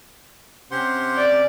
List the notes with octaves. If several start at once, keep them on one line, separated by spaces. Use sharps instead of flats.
C3 C#4 G4 C5 F#5 C6
D5